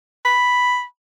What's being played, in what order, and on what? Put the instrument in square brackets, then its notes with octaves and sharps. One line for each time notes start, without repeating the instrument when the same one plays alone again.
[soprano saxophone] B5